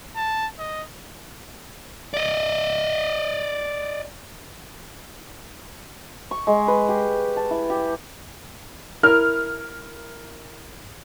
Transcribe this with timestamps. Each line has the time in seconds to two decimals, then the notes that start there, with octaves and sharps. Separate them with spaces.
0.16 A5
0.59 D#5
2.14 D5 D#5
6.31 C#6
6.47 G#3
6.68 B4
6.89 G4
7.37 A5
7.51 E4
7.70 G4
9.03 E4 A#4 F6